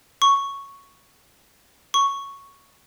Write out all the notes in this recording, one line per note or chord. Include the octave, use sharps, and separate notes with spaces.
C#6
C#6